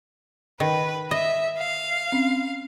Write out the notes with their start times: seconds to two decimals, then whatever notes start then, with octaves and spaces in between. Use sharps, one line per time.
0.60 D#3 B4
1.11 D#5 E5
1.59 F5
2.12 C4 C#4